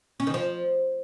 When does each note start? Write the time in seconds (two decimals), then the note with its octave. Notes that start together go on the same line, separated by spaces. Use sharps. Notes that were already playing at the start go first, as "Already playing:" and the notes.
0.20 C#4
0.27 D#3
0.34 F3